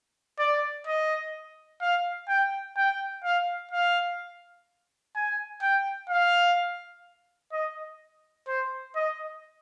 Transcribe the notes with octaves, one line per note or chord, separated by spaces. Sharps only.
D5
D#5
F5
G5
G5
F5
F5
G#5
G5
F5
D#5
C5
D#5